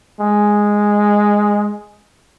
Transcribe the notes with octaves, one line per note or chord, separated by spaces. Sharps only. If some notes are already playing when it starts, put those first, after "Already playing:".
G#3